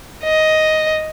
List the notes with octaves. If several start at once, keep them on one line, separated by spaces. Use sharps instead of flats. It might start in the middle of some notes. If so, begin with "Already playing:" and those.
D#5